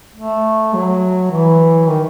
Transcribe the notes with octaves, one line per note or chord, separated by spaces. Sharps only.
A3
F#3
E3
D#3